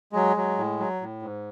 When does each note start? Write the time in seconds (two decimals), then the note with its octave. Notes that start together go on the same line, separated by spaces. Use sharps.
0.12 F#3 G#3
0.37 F#3
0.58 A2
0.79 F#3
1.01 A2
1.22 G#2